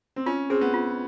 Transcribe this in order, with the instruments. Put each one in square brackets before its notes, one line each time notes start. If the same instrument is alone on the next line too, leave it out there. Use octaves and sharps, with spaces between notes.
[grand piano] C4
[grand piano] C#4 [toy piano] F4
[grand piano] C4 [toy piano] G#4 C5
[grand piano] B3
[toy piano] F4